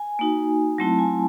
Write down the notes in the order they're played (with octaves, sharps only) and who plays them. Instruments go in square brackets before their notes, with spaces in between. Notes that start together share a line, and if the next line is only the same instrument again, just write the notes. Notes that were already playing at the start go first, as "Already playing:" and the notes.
Already playing: [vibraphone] G#5
A#3 D#4 F#4
F#3 A3 C4 E4 A5
G#5